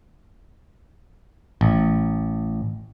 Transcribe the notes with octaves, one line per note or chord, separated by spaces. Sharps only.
A1